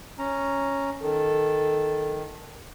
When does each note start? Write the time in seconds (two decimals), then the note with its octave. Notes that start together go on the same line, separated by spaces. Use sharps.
0.18 C#4 A#5
1.03 D#3 A4